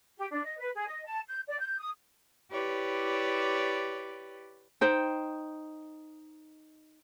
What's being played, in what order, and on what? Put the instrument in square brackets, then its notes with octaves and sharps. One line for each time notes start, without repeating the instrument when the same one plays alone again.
[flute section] G4
D4
D#5
B4
G#4
D#5
A5
G6
D5
G6
D#6
[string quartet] E4 G4 B4 C#5 D5
[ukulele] D#4 C5 G5